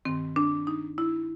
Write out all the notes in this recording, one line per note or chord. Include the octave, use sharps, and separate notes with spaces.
G2 D#3 C4
D4
D#4
E4